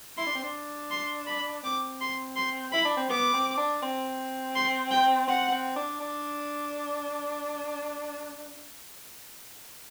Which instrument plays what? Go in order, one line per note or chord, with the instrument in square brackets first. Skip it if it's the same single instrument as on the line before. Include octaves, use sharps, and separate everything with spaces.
[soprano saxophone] E4 [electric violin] C6
[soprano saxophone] D4
C4
D4
[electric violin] C6
B5
[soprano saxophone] C4 [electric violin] D6
[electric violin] C6
C6
[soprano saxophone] E4 [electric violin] B5
[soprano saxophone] D4
C4
[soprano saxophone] B3 [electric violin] D6
[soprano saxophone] C4
D4
C4
[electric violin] C6
G5
[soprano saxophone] C4 [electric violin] F#5
[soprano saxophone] C4
D4
D4